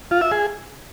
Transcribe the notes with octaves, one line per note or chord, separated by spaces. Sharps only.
F4
E5
G#4